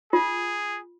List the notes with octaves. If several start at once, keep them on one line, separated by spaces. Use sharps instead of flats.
F4 G#4